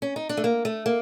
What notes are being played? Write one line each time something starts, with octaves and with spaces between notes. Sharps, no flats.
C#4
D#4
D4
A3
A#3
A3
A#3